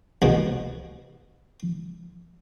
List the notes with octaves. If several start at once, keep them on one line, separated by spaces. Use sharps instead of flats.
C2 B2